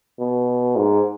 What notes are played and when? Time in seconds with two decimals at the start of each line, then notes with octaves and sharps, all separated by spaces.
0.20 B2
0.76 G#2